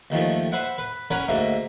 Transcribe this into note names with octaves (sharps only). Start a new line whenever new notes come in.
D#2 D#3 F3 A3
B4 C5 E5 F#5
B4
C#4 A#4 B4 C#5 F#5
D2 G#2 A#3 E5